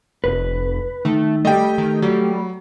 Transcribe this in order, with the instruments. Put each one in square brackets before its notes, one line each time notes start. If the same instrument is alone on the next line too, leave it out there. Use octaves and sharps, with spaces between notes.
[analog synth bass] F1 [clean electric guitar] B4
[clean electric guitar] D#3 [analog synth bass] A3
[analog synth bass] G3 [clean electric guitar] A3 G4 [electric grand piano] D#5 G5
[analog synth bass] D#3
[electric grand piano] F#3 [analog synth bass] G3